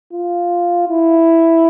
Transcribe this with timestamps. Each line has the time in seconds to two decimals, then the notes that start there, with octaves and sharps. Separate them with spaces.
0.13 F4
0.89 E4